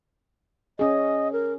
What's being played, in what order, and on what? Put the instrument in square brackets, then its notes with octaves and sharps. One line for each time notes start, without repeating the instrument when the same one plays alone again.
[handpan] C#4 G#4 [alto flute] D#5
[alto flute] A#4